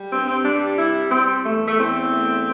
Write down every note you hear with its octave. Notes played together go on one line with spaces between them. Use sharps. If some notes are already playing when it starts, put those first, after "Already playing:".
Already playing: G3
G2 C4
C4
G3 D4
C3 E4
G3 C4
E2 A3
A3
E2 C4
A3